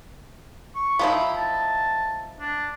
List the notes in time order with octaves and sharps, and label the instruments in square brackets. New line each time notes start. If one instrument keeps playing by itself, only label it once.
[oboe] C#6
[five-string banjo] F3 D#4 E4 [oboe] B5
[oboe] A5
D4